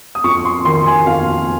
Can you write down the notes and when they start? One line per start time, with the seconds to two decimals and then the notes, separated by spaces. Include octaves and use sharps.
0.15 D#6
0.24 F2 C#6
0.45 C6
0.65 D#3 C6
0.86 G#5
1.07 F2 F5